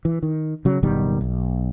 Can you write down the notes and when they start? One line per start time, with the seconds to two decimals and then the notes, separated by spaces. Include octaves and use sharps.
0.05 E3
0.23 D#3
0.65 C#3 F#3
0.83 F#1 B2 D#3 G3
1.21 B1